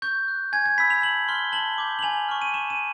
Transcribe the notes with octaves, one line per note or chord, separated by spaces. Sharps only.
C#6 G6
F#6
G#5 G#6
G#6
B5 E6 B6
F7
A5 F#7
C6 F6 G7
A5 F#7
D6 G6
F#7
G#5 F7
C#6 F6
D#7
C#6 E7
D#7